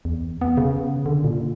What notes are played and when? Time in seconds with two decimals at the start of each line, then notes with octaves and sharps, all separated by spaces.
0.05 E2
0.41 B3
0.57 C#3
1.06 D3
1.24 A#2